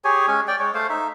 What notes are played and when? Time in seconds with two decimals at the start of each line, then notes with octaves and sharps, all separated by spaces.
0.04 G4 G#4 C#5 G#5
0.28 G#3 C#4 G#5
0.48 D5 G5
0.59 G#3 C#5
0.74 A3 C5 F5
0.89 D#4 E5